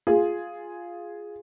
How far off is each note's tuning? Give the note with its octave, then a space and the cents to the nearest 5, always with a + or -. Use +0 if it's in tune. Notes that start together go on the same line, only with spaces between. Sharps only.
F4 +0 G#4 +0